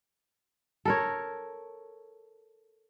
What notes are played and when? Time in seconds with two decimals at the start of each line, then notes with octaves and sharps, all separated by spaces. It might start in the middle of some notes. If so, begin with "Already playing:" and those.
0.85 A4 A#4 C#5